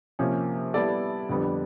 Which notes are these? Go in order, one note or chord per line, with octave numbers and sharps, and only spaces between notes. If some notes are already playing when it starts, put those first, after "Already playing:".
C3 F3 A#3 C#4
G3 B3 E4 A4 D5
F2 D3 G3 B3